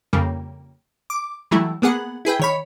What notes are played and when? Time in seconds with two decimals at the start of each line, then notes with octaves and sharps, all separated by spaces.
0.13 F2 C#3 G3 A#3
1.10 D6
1.51 E3 F#3 G3 A3 E4
1.82 A#3 B3 G#4 F#5
2.25 E4 G#4 B4 G5
2.40 D#3 C#5 B5